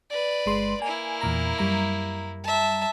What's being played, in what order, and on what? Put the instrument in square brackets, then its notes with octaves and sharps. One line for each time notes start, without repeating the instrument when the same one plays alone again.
[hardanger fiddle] B4 D5
[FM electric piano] G1 G#3 C6
[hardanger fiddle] A#3 E4 [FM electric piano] G#5
[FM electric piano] E2 A#2 A#5
F#2 G3 A#5
[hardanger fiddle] E5 A5